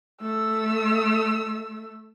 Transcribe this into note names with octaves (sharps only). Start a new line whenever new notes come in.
A3 E6